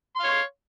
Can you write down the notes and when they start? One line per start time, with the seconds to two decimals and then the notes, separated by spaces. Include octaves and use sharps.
0.16 C6
0.20 F5
0.24 C#5